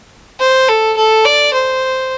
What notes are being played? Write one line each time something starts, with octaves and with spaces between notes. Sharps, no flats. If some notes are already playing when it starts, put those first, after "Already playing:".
C5
A4
A4
D5
C5